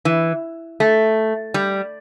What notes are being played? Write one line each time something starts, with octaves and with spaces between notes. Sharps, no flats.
E3
A3
G3